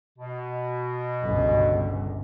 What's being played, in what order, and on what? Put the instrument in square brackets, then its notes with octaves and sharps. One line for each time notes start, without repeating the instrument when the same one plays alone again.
[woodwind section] B2
[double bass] G1 C#2